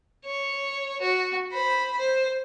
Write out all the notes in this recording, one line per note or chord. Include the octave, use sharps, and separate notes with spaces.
C#5
F#4
C5 B5
C5